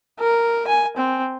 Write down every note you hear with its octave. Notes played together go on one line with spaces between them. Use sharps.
A#4
G#5
C4